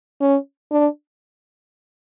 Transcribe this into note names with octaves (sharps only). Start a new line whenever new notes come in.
C#4
D4